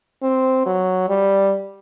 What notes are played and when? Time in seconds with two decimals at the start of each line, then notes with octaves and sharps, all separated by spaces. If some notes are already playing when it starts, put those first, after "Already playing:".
0.23 C4
0.66 F#3
1.09 G3